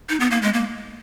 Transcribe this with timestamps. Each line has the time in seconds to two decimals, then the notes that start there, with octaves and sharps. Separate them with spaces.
0.09 D#4
0.20 B3
0.31 A#3
0.42 G#3
0.54 A#3